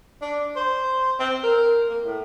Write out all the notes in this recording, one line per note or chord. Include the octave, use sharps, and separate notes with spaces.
D4
C5
C4
A#4
A#3
A2